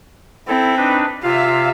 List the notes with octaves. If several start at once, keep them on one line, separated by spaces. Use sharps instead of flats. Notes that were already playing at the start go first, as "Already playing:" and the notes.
C4 E4 A4
D4 D#4 B4
C3 F4 E5 F5